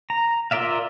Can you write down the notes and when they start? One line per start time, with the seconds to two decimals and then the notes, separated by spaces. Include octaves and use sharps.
0.10 A#5
0.51 F4 A#4 D5 E5 F5